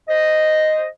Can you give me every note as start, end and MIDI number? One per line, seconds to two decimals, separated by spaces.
0.09 0.86 72
0.09 0.86 75